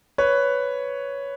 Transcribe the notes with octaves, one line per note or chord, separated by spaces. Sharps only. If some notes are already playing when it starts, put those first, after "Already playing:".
B4 C#5